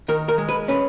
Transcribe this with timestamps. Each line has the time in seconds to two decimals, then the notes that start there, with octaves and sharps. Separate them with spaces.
0.08 D#3 A#4
0.29 A#4
0.38 G#3
0.49 B4
0.68 C#4 B4